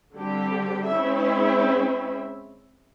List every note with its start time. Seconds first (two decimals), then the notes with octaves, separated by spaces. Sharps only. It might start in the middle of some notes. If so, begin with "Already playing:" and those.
0.14 D3 G3 C4 G4
0.89 G#3 C4 C#4 E4 E5